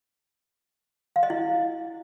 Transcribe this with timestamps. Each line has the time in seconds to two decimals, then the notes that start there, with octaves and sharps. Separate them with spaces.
1.16 F5
1.23 D#5
1.30 E4